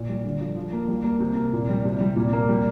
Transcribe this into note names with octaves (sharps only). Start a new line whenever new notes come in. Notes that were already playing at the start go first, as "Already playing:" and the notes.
Already playing: A#2
G3
D3
F3
F3
A#3
G3
A#3
C3
A#3
A#2
G3
C3
G3
A#2
A#3
G3